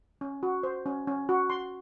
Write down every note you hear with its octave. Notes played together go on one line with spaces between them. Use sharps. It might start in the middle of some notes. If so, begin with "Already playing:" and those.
C#4
F#4
C5
C#4
C#4
F#4
C6